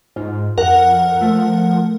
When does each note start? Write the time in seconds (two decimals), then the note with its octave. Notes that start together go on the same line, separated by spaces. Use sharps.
0.16 G#2 F4
0.58 F2 A#4 F#5
1.21 F3 A3